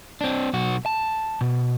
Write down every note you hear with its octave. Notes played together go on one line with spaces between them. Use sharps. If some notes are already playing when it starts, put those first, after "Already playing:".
C4 D4
B1 F#4
A5
B2